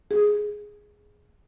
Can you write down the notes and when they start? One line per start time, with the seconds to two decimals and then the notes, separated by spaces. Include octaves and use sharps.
0.11 G#4